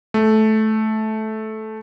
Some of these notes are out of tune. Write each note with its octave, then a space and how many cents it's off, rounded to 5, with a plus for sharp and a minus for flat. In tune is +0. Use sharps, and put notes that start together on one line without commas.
A3 -15